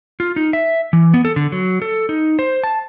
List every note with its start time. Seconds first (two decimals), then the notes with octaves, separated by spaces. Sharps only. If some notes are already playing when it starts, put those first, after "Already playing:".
0.20 F4
0.36 D#4
0.53 E5
0.93 E3
1.14 B3
1.25 A4
1.36 D3
1.52 F#3
1.82 A4
2.09 D#4
2.39 C5
2.64 A5